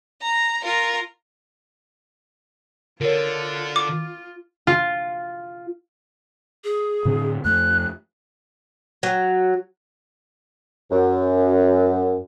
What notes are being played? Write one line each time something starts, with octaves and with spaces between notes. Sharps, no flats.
A#5
F4 A#4
D3 F4 A#4 C#5
D6
F4
G#4
A2 D3 C4
F2 A3 F#6
F#3
F#2